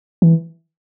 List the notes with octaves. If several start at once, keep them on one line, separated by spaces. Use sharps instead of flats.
E3